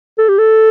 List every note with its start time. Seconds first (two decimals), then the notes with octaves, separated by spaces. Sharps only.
0.18 A4
0.29 G4
0.39 A4